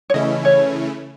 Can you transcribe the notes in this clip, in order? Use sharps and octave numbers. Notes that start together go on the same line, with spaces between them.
C#5
C#3 E3 A3 C#4 E4 D#5
C#5